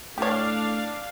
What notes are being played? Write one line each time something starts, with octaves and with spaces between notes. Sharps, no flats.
A2 D4 G4 C#5 F5